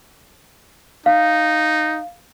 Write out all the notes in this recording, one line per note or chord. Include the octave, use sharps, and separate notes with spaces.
D#4 F5